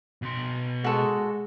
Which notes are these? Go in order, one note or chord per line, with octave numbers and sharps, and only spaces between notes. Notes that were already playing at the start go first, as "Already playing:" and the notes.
B2 C6
G#3 F#4 A4